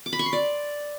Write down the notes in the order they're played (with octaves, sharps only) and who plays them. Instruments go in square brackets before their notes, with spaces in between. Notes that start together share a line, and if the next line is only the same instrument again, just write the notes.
[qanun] D6
B5
C#6
C6
D5